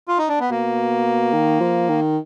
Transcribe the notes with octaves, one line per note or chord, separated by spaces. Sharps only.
F4
D#4
D4
B3
B2 A#3
D#3
F3
D#3